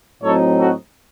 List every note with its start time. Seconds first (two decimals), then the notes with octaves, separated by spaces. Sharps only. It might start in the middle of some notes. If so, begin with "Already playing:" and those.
0.22 A2 F#3 C4 D#4 A4 C#5
0.57 F#4 A4